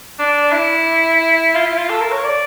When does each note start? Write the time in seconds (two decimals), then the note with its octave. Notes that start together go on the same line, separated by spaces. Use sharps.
0.19 D4
0.52 E4
1.55 F4
1.66 E4
1.78 F4
1.90 A4
2.01 A#4
2.12 C#5
2.24 D5